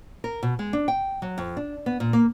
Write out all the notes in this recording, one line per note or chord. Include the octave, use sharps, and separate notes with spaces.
A#4
B2
G#3
D4
G5
F#3
F2
D4
B3
A#2
A#3